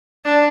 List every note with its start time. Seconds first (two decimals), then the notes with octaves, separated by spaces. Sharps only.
0.25 D4